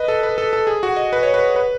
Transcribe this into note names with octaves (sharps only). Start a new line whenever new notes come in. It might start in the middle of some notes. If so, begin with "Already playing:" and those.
Already playing: B4 D#5
A4
B4
A4
A4
G#4
F#4
D#5
B4
C#5
B4
B4